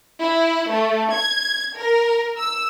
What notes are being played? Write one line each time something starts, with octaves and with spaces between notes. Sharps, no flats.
E4
A3
G#6
A#4
E6